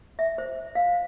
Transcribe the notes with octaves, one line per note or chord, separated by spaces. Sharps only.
E5
C5
F5